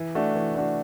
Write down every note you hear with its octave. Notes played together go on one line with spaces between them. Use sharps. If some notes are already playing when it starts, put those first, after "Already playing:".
Already playing: E3
A3 D4 F#4
E3
A3 D4 F#4